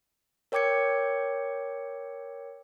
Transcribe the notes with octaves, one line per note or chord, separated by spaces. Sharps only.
A#4 C#5 G5 D6 G#6 C#7